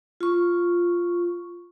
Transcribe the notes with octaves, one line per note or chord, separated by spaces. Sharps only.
F4 C#6